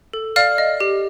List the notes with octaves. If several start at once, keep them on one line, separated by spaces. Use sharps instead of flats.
A4
D5 F5 F6
D#5
G4